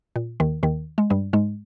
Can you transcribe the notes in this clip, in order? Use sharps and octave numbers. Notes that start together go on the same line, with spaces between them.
A#2
D#2 D#3
D#2 D#3
G#3
G2 G3
G#2 G#3